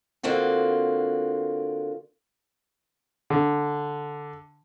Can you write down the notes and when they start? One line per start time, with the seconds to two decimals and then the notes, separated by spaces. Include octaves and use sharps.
0.23 D3 A#3 C4 F4 F#4
3.30 D3